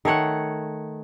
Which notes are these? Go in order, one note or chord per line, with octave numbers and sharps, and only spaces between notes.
D#3 A3 C#5 F#5